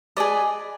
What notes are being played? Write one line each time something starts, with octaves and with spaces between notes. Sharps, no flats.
G#4 B4 D5 D#5